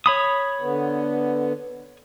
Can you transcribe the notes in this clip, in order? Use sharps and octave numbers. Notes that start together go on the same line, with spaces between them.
C#5 B5 D#6
D3 B3